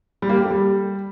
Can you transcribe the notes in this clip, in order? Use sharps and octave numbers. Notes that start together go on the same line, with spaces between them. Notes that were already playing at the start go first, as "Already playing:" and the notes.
G3
A#3
G4
A4
G3